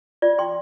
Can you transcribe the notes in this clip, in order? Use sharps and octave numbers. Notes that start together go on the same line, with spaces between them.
F4 D5
G5 C6